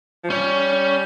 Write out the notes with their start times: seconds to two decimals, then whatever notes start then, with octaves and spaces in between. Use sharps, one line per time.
0.24 F3
0.30 G3 C#4